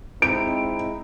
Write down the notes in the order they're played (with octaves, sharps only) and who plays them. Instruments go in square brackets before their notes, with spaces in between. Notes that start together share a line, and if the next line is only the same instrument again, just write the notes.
[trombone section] G#3 D#4 E4 [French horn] C4 [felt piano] D7